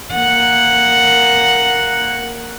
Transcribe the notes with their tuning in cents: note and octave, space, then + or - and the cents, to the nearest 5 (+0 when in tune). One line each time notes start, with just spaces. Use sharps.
A#3 +0 F#5 +0